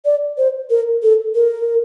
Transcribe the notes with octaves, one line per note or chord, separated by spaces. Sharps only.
D5
C5
A#4
A4
A#4